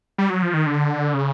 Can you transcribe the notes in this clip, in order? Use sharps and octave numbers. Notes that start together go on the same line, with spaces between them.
G3
F#3
F3
D#3
D3
C#3